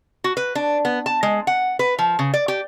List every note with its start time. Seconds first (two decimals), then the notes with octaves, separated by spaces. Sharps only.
0.24 F#4
0.37 B4
0.55 D4
0.85 B3
1.06 A5
1.23 G#3
1.47 F#5
1.79 B4
1.99 F3
2.19 C#3
2.34 D5
2.48 G4